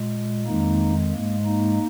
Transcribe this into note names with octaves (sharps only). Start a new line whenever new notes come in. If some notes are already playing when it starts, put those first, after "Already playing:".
Already playing: A#2 G#3
F2 D#3 G#3 A#3 D#4
G#2 G#3 A#3
A#3 D#4